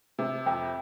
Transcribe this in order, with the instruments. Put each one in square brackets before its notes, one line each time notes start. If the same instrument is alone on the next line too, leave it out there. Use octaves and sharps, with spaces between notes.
[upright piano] C3
[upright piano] F2 [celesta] G5